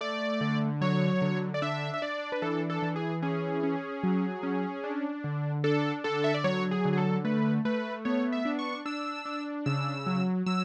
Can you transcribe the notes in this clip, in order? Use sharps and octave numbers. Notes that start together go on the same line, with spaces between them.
A3 D5
D3
F#3 C#5
D3
D5
D4 E5
E5
D4 D5
B4
E3 A4
A4
E3
G#4
C#4 G#4
C#4
F#3
C#4
D4
D3
D4 A4
D3 A4
E5
D5
F#3 C#5
G#4
D3
G#4
A4
A3 B4
A3 B4
B3 C#5
E5
D4
C#6
D4 E6
D4
C#3 E6
F#3
F#3 E6